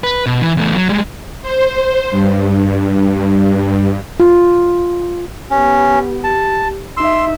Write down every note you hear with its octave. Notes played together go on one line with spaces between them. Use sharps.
B4
B2
E3
E2 A3
F#3
G3 G#3
C5
G2
F4
B3 C#4 G4
G4 A5
D#4 E5 C6 E6